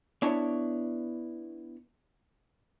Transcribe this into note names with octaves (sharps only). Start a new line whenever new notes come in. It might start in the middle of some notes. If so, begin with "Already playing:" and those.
B3 D4 E4 C#5